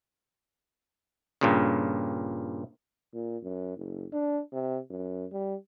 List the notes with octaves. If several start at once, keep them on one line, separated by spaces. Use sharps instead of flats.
G2 A#2 C#3
A#2
F#2
F#1
D4
C3
F#2
G3